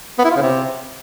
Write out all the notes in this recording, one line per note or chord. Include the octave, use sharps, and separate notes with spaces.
B3
E4
F4
C#3
C3